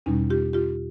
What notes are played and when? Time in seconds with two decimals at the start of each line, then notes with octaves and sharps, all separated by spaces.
0.06 E2 B2 G3 C#4 D#4
0.30 F4 G4
0.53 F4 G4